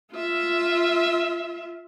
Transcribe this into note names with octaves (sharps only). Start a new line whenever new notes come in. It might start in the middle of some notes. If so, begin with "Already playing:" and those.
F4 E5